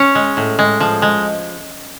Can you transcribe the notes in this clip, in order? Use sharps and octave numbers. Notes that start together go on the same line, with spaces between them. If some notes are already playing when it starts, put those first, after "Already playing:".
Already playing: C#4 C#5
G#3
A2
G#3
F3
G#3